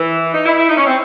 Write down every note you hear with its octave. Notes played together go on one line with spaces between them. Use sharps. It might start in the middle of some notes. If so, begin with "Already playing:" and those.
Already playing: E3
D#4
E4
E4
D#4
C#4
C4